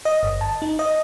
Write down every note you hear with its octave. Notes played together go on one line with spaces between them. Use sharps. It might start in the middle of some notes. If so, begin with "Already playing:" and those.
D#5
G1
A5
D#4
D#5